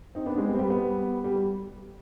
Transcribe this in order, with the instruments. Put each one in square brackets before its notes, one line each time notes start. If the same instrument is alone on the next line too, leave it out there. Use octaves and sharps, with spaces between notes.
[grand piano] C4 D#4
B3 D4
G#3 C4
G3 B3
C4
G3 B3
G3 B3
G3
G3